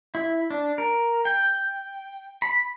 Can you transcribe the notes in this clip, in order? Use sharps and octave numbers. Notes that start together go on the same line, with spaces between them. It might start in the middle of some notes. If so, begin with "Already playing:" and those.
E4
D4
A#4
G5
B5